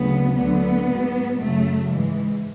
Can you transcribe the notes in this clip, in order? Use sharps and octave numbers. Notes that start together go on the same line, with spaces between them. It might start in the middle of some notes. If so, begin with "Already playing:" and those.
Already playing: D2 C#3 F#3 B3
D2 D3 F#3 B3
G#2 F#3
F#2 C#3 F#3 A3
G#2 E3 G#3